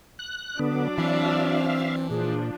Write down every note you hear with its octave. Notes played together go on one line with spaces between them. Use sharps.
F#6
D3 F#3 B3 D4 D5
E3 C4 E5 F5
A#2 F3 D4 G#4